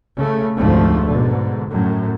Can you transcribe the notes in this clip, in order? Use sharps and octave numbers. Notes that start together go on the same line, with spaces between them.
C#3 A3
F1 D2 G#2 F3 A3
G#2 B2 D3
F#2 A2